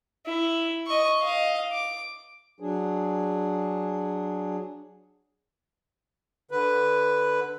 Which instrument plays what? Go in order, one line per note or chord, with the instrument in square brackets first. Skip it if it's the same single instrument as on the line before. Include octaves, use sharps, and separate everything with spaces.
[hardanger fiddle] E4
D#5 C#6
D#5 F5
D6
[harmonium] F#3 D4 G#4
[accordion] D3 B4